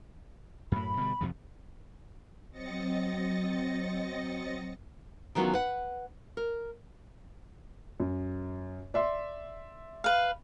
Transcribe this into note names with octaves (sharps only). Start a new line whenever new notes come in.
F#2 A2 B5
B2 D3 G3
F2 C3 F3
F#3 C4 D#5 A6 A#6 C#7
D#3 E3 F#3 B3 C#4 F4
B4 F#5
A#4
F#2
D5 E5 C6
B4 F5